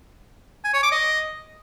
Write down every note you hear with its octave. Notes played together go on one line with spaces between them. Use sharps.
G#5
C#5
D6
D#5